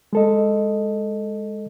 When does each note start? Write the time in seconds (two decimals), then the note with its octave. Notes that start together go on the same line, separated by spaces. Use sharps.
0.13 G#3 A4 D#5